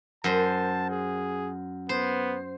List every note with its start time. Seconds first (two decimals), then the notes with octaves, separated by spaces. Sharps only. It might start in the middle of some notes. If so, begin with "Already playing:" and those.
0.24 F#2 C5 A5
0.90 G#4
1.89 B3 C5